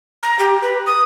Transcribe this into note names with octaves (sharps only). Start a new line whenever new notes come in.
A#5
G4
B4
D#6